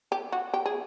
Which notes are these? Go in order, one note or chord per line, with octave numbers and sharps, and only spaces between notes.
G4
F#4
G4
G#4